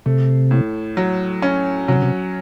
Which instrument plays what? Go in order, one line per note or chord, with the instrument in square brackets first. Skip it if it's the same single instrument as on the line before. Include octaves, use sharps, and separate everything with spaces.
[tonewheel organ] C3 [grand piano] A3
[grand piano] A2
F#3
C#4
[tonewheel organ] C3 [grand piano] F#3
[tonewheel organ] C#3
C3